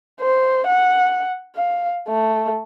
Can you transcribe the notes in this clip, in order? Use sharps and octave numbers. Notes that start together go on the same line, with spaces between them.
C5
F#5
F5
A3